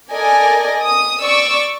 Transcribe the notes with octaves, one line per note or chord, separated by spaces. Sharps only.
A4 A#4 D5 D#5 G#5
D#6
D5 C#6 D6 E6